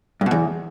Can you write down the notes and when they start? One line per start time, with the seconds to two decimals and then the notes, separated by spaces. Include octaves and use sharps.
0.21 G2
0.26 B2
0.31 E2